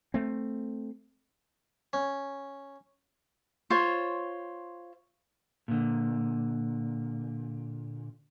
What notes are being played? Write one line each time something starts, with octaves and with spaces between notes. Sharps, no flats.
A3 C4
C#4
F4 C5 C#5
A#2 D3